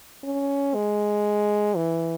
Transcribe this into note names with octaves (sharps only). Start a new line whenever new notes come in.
C#4
G#3
E3